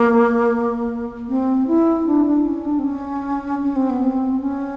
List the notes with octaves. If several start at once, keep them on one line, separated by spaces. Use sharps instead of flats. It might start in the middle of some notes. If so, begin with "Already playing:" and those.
Already playing: A#3
C4
E4
D4
D4
C#4
D4
C4
C#4
C#4
C4
B3
C4
C#4